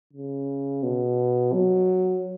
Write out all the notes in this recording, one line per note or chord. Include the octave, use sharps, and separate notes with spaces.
C#3
B2
F#3